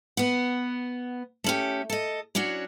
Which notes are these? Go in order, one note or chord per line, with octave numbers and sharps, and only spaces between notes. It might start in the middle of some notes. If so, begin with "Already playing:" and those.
B3 F#5
A3 C#4 G4
A4 D#5
F#3 C#4 D4 F#4